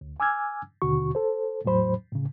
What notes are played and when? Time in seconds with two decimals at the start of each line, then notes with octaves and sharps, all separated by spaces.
0.01 D2
0.20 G#5 D6 E6 F6 G#6
0.82 D#2 B2 D3 F#4 C#6
1.15 A4 C5
1.65 E2 A2 F#3 C5 B5
2.12 A2 C#3